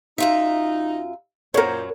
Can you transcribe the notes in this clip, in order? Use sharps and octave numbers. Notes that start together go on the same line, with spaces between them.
F#2 D#4 F4 E5
F#2 A#2 F#3 A#4 C5 C#5